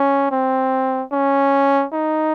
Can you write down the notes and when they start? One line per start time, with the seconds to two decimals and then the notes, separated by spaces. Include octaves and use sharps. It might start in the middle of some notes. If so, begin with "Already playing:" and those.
Already playing: C#4
0.31 C4
1.12 C#4
1.93 D#4